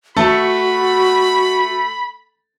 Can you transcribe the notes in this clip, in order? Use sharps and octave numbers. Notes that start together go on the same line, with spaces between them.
A3 F#4 A4 B5